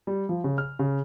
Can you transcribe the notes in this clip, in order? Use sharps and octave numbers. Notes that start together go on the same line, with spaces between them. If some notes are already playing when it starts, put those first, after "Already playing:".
G3
F3
C#3
F6
C#3